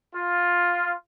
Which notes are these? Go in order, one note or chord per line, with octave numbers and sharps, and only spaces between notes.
F4